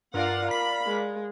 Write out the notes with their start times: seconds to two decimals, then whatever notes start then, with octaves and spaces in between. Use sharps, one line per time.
0.14 G2 F4 A#4 D5 F5 F#5
0.51 B5 B6
0.87 G#3